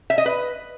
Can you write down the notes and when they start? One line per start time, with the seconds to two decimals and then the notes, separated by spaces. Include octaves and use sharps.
0.10 E5
0.18 D#5
0.26 B4